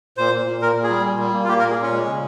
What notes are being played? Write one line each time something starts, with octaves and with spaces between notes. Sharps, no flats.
A#2 C5
A#2
A#2
A#2 A#4
A#2
G#4
G3
A#2
G3
A#3
F4
A#3 G4
A#4
A#2
G#4
A#2 C#4
G#3
C#3